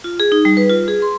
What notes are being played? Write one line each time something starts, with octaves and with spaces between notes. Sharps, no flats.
F4
G#4
D#4
G3
B4
F4
G#4
C6